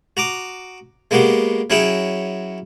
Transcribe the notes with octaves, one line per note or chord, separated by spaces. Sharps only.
F#4 A#5 D6 D#6
G#3 A#3 B3 F#4 G4
F#3 C#4 E4 F#4 G#4 G5